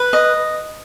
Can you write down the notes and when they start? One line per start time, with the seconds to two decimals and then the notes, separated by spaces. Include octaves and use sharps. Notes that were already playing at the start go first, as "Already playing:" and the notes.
Already playing: B4
0.13 D#5